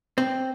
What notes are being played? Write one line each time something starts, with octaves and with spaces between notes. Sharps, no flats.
C4